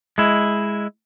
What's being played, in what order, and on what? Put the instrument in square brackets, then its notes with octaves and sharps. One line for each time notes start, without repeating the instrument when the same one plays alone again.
[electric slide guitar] G#3 E4